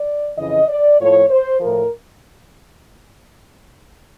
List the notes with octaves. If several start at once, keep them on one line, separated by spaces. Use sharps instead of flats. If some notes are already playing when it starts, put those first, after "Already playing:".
Already playing: D5
F2 C#3 E3 D#5
D5
A2 F3 C#5
C5
A2 F3 A#4